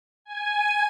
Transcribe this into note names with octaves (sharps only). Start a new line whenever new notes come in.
G#5